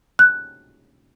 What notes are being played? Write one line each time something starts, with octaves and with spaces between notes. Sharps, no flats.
F#6